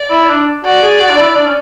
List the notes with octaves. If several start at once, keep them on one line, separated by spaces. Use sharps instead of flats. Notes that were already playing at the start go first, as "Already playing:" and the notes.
Already playing: D5
E4
D4
F#4 D5
G#4
F#4
D4
E4
D4
C#4